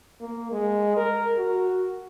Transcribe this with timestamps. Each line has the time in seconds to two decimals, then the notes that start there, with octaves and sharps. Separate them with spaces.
0.21 A#3
0.52 G#3
0.97 A#4
1.38 F#4